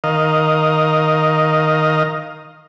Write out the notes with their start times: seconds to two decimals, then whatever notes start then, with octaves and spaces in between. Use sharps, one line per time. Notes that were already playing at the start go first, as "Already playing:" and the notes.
0.04 D#3 A#4 D#5 F5